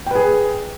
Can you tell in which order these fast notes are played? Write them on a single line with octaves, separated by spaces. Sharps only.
G5 B4 G#4